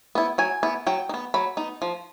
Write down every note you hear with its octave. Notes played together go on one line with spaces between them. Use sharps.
B3 E4
F#3 G#5
B3 E4
F#3 G5
D#4
B3
F#3 B5
B3 D#4
F3